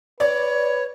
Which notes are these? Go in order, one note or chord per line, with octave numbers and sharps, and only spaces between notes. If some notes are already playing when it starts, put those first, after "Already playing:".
B4 C#5 D5